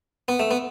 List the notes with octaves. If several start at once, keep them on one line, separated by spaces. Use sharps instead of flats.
B3
A3
B3